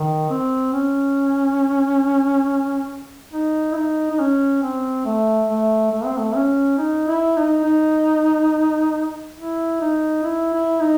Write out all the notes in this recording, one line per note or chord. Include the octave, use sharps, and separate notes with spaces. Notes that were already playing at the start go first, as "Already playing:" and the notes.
Already playing: D#3
C4
C#4
D#4
E4
D#4
D#4
C#4
C4
A3
A3
A3
C4
A3
C#4
D#4
E4
D#4
D#4
E4
D#4
E4
E4
D#4